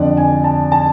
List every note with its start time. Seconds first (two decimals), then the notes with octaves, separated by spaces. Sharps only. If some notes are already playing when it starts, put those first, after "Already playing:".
Already playing: F2 D3 D5
0.17 G#5
0.44 A5
0.72 A5